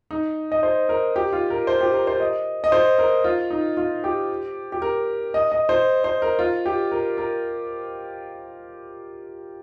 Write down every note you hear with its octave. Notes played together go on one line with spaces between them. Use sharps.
D#4
D#5
C5
A#4
G4
F4
A#4
C5
G4
A#4
C5
D#5
D#5
C5
A#4
F4
D#4
F4
G4
G4
A#4
D#5
D#5
C5
C5
A#4
F4
G4
A#4
A#4